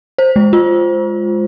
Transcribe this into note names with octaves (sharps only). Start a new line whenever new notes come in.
C5
G#3
F4